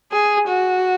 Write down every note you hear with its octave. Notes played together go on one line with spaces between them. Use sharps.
G#4
F#4